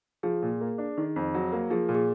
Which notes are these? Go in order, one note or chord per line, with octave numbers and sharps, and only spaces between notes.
F3 G#4
A#2
A#3
D4
D#3
F2
F#3
A#3
F3 G#4
A#2
G#4